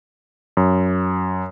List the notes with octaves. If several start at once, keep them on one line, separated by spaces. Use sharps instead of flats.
F#2